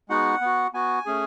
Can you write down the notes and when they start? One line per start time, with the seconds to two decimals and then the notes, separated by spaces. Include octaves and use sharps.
0.09 G#3 B3 D#4 F#4 F#5
0.41 B3 F#4
0.73 B3 F#4 G#5
1.06 A3 C#4 G#4